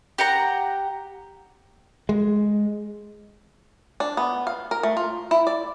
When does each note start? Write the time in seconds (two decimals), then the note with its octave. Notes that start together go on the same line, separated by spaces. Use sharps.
0.18 G4 F#5 A#5
2.09 G#3
4.00 D4
4.17 B3
4.47 F5
4.71 A#4
4.83 A3
4.97 F4
5.31 E4
5.47 D5